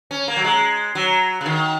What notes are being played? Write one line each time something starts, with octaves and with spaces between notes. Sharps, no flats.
C#4
A#3
F#3
G#3
F#3
C#3
D#3